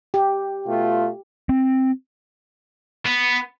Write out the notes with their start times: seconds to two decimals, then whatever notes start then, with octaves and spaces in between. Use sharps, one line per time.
0.14 G4
0.66 B2 A3 F4
1.49 C4
3.06 B3